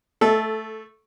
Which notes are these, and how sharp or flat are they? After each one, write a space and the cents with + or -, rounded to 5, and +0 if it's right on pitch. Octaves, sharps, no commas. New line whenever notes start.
A3 +0 A4 -15